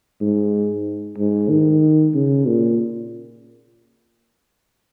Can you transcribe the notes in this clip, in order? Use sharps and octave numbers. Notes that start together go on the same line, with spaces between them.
G#2
G#2
D#3
C#3
A#2